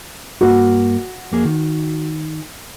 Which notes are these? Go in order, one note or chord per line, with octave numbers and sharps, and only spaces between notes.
G2 A#3 F#4
F2 A#3 G#4
D#3